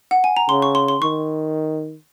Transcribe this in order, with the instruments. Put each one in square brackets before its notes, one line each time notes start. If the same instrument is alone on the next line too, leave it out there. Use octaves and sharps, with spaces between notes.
[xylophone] F#5
G#5
A#5
[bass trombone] C#3 [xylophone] C6
[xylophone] C#6
C6
C6
[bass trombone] D#3 [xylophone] C#6